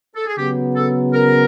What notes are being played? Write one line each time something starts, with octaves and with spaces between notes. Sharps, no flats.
A4
G#4
C#3 F#3 B3 G4
A4
A#4